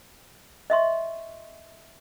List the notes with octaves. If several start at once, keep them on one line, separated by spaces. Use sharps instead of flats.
D#5 E5 C6 C#6